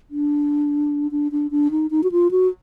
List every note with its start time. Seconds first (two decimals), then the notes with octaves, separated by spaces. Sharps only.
0.11 D4
1.11 D4
1.32 D4
1.51 D4
1.71 D#4
1.91 D#4
2.04 F#4
2.12 F4
2.31 F#4